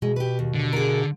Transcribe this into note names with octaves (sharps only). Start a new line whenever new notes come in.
B2 G#3
G4 B4
D#2
D3
G#4 A#4